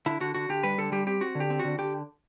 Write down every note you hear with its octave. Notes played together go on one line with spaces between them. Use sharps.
D3 E4
D3 F#4
D3 F#4
D3 G4
G3 B4
D3 A4
G3 G4
C4 G4
C4 F#4
D3
G4
C4
D3 F#4
D3 G4